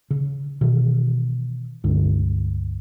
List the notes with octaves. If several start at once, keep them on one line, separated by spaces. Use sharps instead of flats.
C#3
B2 D#3 E3
C#2 G2 D3